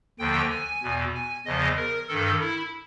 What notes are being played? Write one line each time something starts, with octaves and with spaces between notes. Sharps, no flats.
D#2 D3 F3 G5
G#5
E2 B2
G#5
E2 C#3 F3 D#5
A#4
G2 D#3 A4
E4